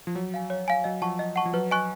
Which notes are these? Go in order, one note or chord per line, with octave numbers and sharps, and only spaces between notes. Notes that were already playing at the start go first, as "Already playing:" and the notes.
F3
F#3 C#5
F5 G#5
C#5
F5 G#5
F#3 D#5
F3 F#5 A5 C#6
D#5
F#5 A5 C#6
F3
F#3 B4
D#5 G#5 C#6 F#6